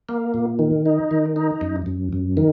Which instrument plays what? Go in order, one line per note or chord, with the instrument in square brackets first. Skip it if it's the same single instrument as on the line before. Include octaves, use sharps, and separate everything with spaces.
[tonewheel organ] A#3
A#2
D#3
D#4
D#3
D#4
F#2
F#2
F#2
D#3